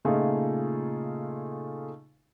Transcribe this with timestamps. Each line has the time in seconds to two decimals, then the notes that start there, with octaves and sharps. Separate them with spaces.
0.05 A#2 C#3 A3 D#4 F4 G#4